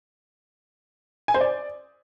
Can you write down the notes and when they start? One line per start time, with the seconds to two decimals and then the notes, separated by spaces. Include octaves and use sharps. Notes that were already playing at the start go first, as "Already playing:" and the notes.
1.28 G#5
1.34 C5
1.41 D5